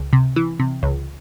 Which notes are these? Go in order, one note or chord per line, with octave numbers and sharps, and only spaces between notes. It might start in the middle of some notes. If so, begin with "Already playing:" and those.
Already playing: C#2
C3
E3
C3
C#2